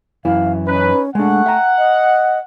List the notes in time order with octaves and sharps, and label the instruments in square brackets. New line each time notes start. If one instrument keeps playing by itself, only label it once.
[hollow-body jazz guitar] F#2 E3 E4 [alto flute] F5
[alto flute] C#4 [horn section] D#4 B4
[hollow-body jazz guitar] G#3 D4 [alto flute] A3 [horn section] F#5
[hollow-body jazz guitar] E5 G5 A#5
[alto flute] D#5